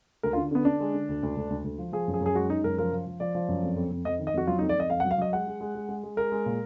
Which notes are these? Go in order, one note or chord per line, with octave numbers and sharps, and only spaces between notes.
D2 A#4
F4
D3
D3 B3
D3 D4
G#3
D3
D2
D2
D2
D2
D2
F3
F3 G#4
F#2
G#4
F#2
G#4
G#3 F#4
G#3 D#4
F#2 A#4
F3 A#4
F3
F3
F3 D5
F3
F#2
F2
F2
F2
F2 D#5
D#3
D#5
F2 F#4
F#3 F4
D#4
F2
D5
F2 D#5
F2 F5
F#5
F#3
F5
F#3 D#5
G#3 F#5
G#3
G#3
G#3
G#3
G#3
G#3 A#4
G#3
A#2